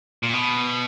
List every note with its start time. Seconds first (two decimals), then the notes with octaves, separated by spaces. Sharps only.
0.23 A#2
0.33 B2